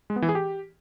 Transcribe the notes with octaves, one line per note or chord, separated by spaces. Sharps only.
G#3
B3
E3
G#4
G4